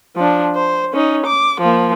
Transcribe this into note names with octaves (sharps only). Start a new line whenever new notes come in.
F3 D4
C5
C#4 D#4
D6
F3 A#3